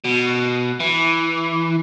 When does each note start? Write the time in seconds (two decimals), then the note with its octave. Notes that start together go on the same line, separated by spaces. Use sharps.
0.05 B2
0.80 E3